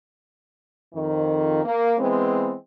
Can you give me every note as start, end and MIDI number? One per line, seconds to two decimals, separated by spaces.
0.94 1.64 41
0.94 1.64 51
1.65 1.95 58
2.00 2.53 52
2.00 2.53 56
2.00 2.53 59
2.00 2.53 60